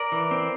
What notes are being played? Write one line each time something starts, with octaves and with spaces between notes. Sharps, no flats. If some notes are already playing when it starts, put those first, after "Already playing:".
Already playing: A#4 D5
E3
C4